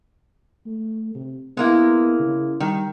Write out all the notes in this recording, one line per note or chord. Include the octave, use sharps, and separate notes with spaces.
A3
C3
G#3 A#3 B3 E4
C#3
D#3 G3